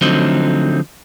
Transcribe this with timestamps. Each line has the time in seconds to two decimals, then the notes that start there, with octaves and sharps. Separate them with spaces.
0.01 D3 F3 F#3 A3 C4 D#4